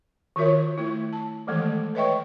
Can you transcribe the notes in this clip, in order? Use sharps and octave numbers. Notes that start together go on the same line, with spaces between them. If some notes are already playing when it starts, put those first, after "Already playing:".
D#3 F4 F#4 A#4 C#5 E5
A3 E4
A5
D#3 E3 G#3 A3 A4
B4 C#5 D#5 E5 G5 C#6